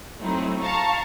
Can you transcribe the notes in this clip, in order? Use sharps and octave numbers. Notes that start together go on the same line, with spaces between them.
F#3 A3 C4 D#4 E4
F5 A5 A#5 C#6